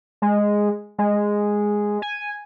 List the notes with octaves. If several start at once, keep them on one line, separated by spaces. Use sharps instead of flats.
G#3
G#3
G#5